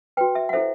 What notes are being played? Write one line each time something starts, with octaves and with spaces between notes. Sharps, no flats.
F#4 B4 G5
E5
F#5
E4 A4 C5 E5